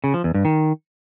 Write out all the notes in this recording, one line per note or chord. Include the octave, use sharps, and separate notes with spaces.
C#3
F3
E2
G2
D#3